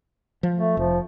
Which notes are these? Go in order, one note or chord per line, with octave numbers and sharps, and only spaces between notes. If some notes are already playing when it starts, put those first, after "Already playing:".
F3
A3
F1 F3